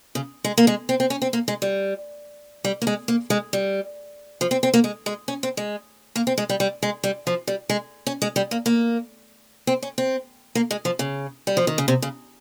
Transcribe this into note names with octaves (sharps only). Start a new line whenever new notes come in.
C#3
G#3
A#3
G#3
C4
C4
C#4
C4
A#3
G#3
G3
G3
A#3
G#3
A#3
G#3
G3
F3
C4
C4
A#3
G#3
G#3
C#4
C4
G#3
A#3
C4
G#3
G3
G3
G#3
G3
F3
G3
G#3
C#4
G#3
G3
A#3
A#3
C4
C#4
C4
A#3
G#3
F3
C#3
G3
F3
D#3
C#3
C3
C#3